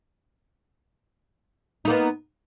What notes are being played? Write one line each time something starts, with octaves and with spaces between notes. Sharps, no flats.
A#3 B3 D#4